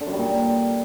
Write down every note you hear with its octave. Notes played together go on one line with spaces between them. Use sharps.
D3
F#2
G3
A#2